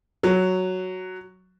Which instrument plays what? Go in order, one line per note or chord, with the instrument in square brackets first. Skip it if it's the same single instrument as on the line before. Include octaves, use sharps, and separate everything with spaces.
[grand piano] F#3